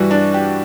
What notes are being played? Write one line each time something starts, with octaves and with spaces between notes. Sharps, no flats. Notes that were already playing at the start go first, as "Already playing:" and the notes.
Already playing: G2 E3 G3 F#4
D4
G4